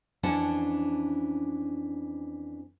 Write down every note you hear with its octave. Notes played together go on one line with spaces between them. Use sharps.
F2 E3 C#4 D4 F#5 A5